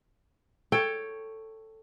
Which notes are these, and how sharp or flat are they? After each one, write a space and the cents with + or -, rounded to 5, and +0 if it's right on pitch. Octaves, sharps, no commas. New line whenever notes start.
A4 +10 C#5 +0 G5 +15